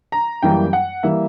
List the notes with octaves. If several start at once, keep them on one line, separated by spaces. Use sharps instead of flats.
A#5
F#2 E3 G3 A#3 G5
F#5
E3 G3 A#3 E5